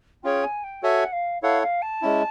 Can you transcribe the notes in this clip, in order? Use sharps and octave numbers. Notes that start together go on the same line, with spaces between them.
C#4 F4 G#4 C#5 G5
G#5
G5
F#4 A4 C#5 E5 F#5 G#5
F5
E4 A4 C#5 F5 F#5
F5
A5
G#3 C#4 E4